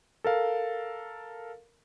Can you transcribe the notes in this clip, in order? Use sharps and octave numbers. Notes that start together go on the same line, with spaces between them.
A4 A#4 F5